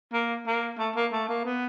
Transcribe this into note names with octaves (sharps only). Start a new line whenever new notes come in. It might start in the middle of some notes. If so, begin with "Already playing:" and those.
A#3
A#3
A3
A#3
A3
A#3
B3